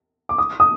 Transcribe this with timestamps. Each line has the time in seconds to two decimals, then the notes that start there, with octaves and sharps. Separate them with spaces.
0.29 D6
0.38 D#6
0.60 D#6